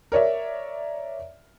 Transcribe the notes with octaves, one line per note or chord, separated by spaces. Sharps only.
A#4 C#5 D5 E5